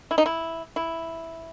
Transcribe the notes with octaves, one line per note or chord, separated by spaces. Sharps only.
E4
D#4
E4
E4